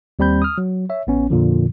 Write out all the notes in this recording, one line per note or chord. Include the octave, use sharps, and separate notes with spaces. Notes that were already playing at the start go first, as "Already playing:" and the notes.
D#2 G3 C4 B5 G6
D#6 F6
F#3
C#5 E5
A1 B3 C#4
F2 A#2 D3 F3